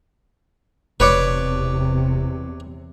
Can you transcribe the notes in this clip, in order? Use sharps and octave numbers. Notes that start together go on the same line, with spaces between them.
F1 E2 C3 B4 C#5 D5